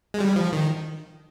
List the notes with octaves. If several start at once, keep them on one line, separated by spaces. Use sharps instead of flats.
G#3
G3
F3
D#3